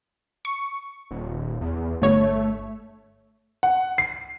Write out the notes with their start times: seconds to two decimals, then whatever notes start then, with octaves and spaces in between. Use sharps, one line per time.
0.45 C#6
1.11 D#1
1.61 E2
2.02 G1 A3 C#5
3.63 F#5
3.98 C7